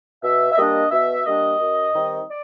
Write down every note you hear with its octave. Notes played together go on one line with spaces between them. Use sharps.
B2 E5
E5
G3 A#3 D4 D#5
B2 E5
G3 A#3 D4 D#5
F#2
D#3 G3 C4 D#4
D5